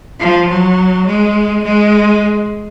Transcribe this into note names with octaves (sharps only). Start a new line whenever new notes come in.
F3
F#3
G#3
G#3